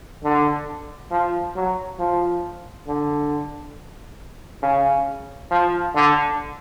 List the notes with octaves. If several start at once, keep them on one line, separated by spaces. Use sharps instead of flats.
D3
F3
F#3
F3
D3
C#3
F3
D3